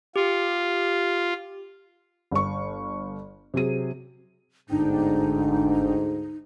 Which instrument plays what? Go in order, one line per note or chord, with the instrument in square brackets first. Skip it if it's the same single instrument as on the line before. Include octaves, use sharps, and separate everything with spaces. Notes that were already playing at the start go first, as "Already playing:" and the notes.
[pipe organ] F4 [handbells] G4
[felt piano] G1 C#6
C3 F#3 G#4 D#7
[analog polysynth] G1 D4 G5 [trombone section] D2 G#2 [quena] D#4